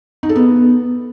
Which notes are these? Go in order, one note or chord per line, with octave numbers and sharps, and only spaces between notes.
D#4
A4
B3